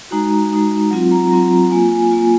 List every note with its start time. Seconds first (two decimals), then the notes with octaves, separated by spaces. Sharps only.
0.11 G#3 D#4 F#4 A#5
0.51 G#3 D#4 F#4
0.91 F#3 C4 F4
1.11 A#5
1.31 F#3 C4 F4
1.71 A#3 F4 G#5
1.92 G#5
2.11 A#3 F4